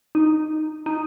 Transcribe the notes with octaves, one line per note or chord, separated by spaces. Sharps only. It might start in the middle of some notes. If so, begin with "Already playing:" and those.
D#4
D#4